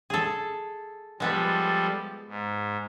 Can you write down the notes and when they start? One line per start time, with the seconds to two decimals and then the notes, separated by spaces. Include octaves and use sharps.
0.10 G#4 A4
1.20 F3 G3 G#3 B3 A4 B4
2.29 G#2